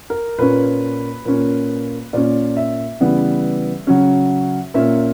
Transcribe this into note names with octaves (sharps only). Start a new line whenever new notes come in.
A#4
A#2 A#3 C#4 B4
A#2 A#3 C#4
A#2 A#3 C#4 D5
E5
C#3 E3 G3 B3
C#3 F#3 C#4
A#2 A#3 C#4 E5